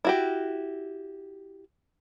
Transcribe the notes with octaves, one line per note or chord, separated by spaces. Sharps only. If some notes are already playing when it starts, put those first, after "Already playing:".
E4 F#4 G4